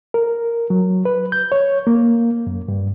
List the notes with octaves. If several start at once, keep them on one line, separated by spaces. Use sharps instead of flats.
A#4
F#3
B4
G6
C#5
A#3
F#2
G2